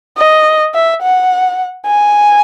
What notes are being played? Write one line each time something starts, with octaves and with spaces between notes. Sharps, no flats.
D#5
E5
F#5
G#5